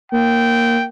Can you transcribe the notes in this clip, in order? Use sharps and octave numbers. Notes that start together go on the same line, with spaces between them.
A#3 G5